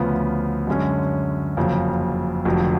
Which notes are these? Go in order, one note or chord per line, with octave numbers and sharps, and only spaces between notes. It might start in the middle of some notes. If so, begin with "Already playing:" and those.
Already playing: D2 C#3 F3 B3
F#2 D3 G#3 C#4
F#1 F2 C#3 F#3
F1 F2 D3 F#3